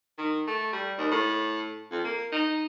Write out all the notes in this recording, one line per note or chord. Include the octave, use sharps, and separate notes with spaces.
D#3
A3
G3
D#2
A2
F2
A#3
D#4